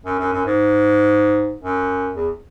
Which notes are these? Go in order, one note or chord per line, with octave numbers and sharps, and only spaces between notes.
F#2
F#2
F#2
G#2
F#2
E2